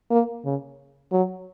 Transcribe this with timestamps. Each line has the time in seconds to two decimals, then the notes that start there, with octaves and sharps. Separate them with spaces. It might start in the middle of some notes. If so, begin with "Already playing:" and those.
0.11 A#3
0.45 C#3
1.12 F#3